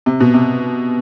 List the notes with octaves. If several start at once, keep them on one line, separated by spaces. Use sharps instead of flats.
C3
B2
C3